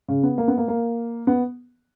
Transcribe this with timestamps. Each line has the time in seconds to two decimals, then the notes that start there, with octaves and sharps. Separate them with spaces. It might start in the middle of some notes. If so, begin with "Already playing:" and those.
0.08 C#3
0.23 B3
0.38 A#3
0.48 B3
0.58 A#3
0.68 A#3
1.27 B3